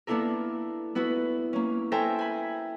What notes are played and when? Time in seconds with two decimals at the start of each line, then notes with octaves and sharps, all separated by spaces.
0.07 A#3 B3 D4 E4 A4 A#4
0.95 B3 E4 F#4 B4
1.53 A#3 C#4
1.92 A4 A#4 C5 E5 G5 G#5
2.19 G#5 B5